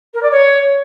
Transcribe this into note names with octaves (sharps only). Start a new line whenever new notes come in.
A#4
D5
C#5